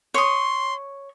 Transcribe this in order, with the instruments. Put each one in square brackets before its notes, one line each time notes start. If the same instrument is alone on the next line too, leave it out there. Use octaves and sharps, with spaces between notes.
[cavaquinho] C#5 D#6 [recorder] C6